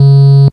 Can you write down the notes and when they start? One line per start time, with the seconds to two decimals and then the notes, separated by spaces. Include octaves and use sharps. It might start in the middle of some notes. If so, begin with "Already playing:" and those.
Already playing: C#3